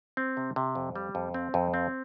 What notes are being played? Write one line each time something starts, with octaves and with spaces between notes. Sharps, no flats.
C4
C3
C3
F2
G3
F2
C4
F2
C4